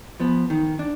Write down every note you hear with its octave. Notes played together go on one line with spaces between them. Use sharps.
F3 B3
D#3
D4